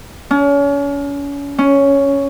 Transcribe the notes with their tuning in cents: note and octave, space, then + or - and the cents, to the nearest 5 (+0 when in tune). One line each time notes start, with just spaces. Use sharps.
C#4 +35
C#4 +5